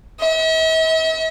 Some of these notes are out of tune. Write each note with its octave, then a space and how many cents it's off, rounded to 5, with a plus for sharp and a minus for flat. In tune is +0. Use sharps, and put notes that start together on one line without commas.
E5 -45